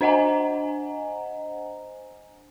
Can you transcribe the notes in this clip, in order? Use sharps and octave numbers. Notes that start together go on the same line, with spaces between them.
D4 C5 D#5 F#5 G#5 A#5